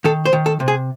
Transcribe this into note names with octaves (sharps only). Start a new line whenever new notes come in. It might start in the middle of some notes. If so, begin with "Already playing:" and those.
D#3 A4
C5
D#3
A4
C3
G#4